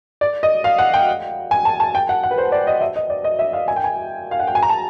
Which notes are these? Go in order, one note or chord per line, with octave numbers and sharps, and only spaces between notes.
D5
D#5
F5
F#5
G5
G#5
A5
A5
G5
F#5
F#5
B4
C5
D5
D#5
E5
D#5
D5
D#5
E5
F5
G#5
G5
G#5
F5
F#5
G5
G#5
A#5
A5